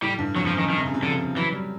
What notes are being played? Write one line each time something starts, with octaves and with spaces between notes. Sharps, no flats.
A2 G3
G2
F2 F#3
F3
F#2
D#3
G2 D#3
C3
C#3
C3
D3 F3
E3 F#3
F#3
G3